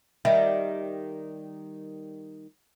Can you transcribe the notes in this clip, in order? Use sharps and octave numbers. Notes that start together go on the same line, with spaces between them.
D#3 G3 E5